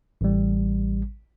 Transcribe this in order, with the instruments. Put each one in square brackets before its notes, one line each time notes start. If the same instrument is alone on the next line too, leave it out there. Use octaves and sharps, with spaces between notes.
[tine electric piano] A1 G3